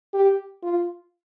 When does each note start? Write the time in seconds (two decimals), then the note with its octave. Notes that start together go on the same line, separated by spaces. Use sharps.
0.14 G4
0.63 F4